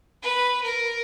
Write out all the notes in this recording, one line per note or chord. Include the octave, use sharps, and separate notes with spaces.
B4
A#4